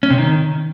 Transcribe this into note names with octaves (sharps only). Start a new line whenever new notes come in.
C#4
C3
D#3